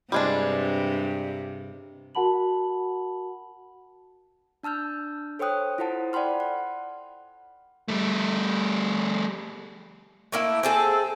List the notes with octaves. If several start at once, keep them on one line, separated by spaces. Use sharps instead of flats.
G2 C3 G3 G#3 D4
F#4 A#4 F#5 A5 B5 F#7
D4 A5 E6 F6 G6
A4 C5 C#5 G5 D#6 F#6
E4 F4 A4 C5 F#5 A5
D5 F#5 G5 B5 C6 F6
F#5
G3 A3
A3 A#3 E4
C4 G#4 A4